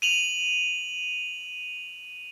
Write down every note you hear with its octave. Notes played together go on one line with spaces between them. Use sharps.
D#7 F7 F#7